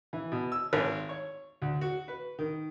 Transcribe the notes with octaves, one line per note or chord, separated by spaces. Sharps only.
E3
B2
E6
G#1
C#5
D2
F#4
B4
D#3